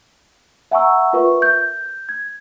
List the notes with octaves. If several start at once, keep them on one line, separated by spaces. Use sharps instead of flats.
E5 F#5 G#5 A#5 C#6 E6
F4 A#4 B4 E5 C#6
G6
G#6